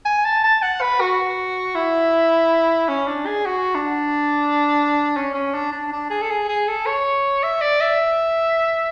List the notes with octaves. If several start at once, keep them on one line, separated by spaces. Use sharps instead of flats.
G#5
A5
A5
F#5
B4
F#4
E4
C#4
D4
G#4
F#4
D4
C#4
C#4
D4
D4
D4
G#4
A4
G#4
G#4
A4
C#5
E5
D5
E5